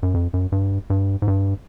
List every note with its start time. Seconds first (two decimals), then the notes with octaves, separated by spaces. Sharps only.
0.03 F#2
0.14 F2
0.34 F#2
0.52 G2
0.90 G2
1.22 G#2
1.28 G2